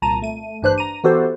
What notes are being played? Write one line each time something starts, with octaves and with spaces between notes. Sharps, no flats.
C2 A#2 A5 A#5 D#7
A3 D#7
A1 G2 D4 B4 C5 F#6
A#5 D#7
E3 B3 F#4 G4 A4 C5